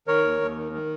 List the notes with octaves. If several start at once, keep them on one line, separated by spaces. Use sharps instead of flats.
D#3 A#4 C#5
D#2
D#2
D#3
D#3